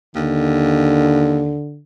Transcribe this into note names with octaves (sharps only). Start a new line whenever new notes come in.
D#2 D3